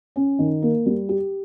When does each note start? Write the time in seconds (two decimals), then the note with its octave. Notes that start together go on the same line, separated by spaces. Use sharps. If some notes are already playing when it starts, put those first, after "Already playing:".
0.16 C#4
0.39 D#3
0.62 A#3
0.86 G3
1.09 G4